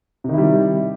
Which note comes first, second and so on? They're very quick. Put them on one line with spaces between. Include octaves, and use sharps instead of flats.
C3 D#3 E4 G3